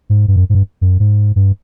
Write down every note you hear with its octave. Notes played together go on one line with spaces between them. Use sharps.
G#2
G2
F#2
G#2
G2
F#2
G#2
G2